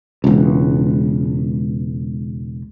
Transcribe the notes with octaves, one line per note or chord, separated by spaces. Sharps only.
E1 C#2